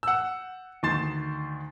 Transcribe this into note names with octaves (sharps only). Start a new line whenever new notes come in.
F#5 E6
D2 D#3 C6 A6 E7